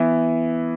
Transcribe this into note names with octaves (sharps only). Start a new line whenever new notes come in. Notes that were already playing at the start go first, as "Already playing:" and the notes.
Already playing: E3 B3 E4